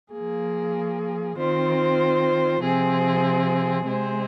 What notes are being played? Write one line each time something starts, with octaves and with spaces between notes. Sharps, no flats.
F3 A#3 G#4
D#3 C4 F4 C5
C3 F3 C4 G#4
C3 G#3 C4 G#4 C5